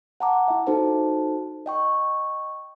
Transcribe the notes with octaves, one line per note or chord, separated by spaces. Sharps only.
F#5 A5 A#5 D6
E4 E5
D#4 F#4 A4 C5 A5
D#5 G5 C#6